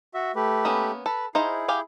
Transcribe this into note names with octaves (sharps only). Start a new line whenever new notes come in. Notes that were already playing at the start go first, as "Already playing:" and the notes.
F#4 E5
A3 G4 B4
A#3 B3 C#4
A4 B4
D#4 E4 G#4 C5 F5
G4 F5 G#5